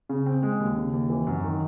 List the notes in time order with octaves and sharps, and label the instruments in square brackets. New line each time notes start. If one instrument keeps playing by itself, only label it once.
[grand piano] C#3
C4
G#3
D#2
C#3
D#2
E3
F#2
D#3